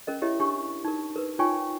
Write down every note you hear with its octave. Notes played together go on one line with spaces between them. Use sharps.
C#4 A#4 D#5
E4 G4 A#4 C#5 D#5 E5
D4 G4 C#6
D#4 A#4
A#4 B4
D#4 F4 C#5 G5 G#5 C#6